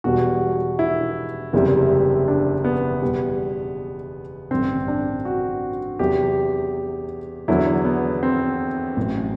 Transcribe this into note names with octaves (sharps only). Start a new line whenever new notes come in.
E1 E2 B2 G3 F#4
E4
F#1 E2 C3 G3
D4
B3
E2 B2 G3
A1 G2 D3 C4
D4
F#4
E2 C3 F#3 G4
E2 D3 F#3 E4
B3
C4
A1 A2 F#3